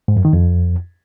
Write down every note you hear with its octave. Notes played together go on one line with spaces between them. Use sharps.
G#2
F#2
D#3
F2